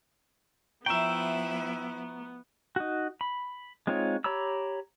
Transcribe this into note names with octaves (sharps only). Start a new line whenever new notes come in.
F3 B3 E4 E5 G5 A#5 C#6 D7
D#4 F#4
B5
G#3 C4 D#4 F4 C#5
G4 C#5 A#5 B5 E6